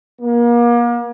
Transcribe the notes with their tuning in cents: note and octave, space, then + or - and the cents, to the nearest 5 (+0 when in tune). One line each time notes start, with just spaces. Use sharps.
A#3 +35